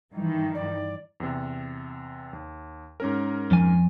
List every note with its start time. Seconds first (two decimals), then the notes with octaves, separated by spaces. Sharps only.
0.14 G2 D#3 E3
0.55 D5
1.20 E2 C3
2.33 D#2
3.00 G#2 C#4 A#4
3.51 F2 F3 G#5